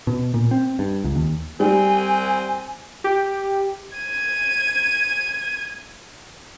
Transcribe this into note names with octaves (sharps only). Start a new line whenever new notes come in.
B2
A#2
C4
G2
C#2
D#2
G3 C4 G#5
G4
G#6 D#7